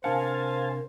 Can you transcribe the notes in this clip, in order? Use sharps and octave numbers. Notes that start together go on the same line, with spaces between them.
C3 D4 A#4 C5 F5 F#5 G#5 A5